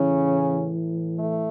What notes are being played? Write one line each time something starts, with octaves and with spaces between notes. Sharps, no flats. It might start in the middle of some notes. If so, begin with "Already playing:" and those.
Already playing: A2 C#3 E3 C#4
A3